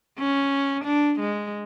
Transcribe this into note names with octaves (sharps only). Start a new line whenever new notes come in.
C#4
D4
G#3